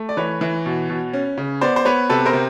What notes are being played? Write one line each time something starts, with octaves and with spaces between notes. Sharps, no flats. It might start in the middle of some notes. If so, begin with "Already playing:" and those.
Already playing: A3
D5
E3 B4 C#5
E3
B2
B2
C#4
C#3
B3 C5 D5
C5
B3 B4 C#5
C3 A4 B4
A#4 C5
C3